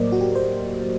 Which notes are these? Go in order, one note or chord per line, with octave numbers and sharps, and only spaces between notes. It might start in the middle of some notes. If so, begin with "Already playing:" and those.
Already playing: A2 F#3 A#3 A#4 C5 D5 D#5
F#4
G4
C5